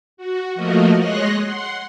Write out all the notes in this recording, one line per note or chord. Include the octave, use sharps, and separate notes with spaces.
F#4
F3 A3 A#3 F#4 A#4 D#5
G#3 C#5 D#5 C6 F#6 A#6
F#5 C6